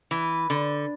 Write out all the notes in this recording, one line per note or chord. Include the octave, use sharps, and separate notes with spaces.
E3
D3